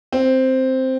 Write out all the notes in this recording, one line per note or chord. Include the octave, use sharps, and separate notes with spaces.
C4